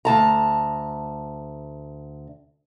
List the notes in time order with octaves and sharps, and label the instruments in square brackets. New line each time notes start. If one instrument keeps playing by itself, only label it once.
[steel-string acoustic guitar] D2 A5 A#5